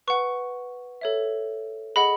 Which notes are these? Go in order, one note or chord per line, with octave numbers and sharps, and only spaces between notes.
B4 F#5 C#6
A4 C#5 E5
G#4 D#5 F#5 B5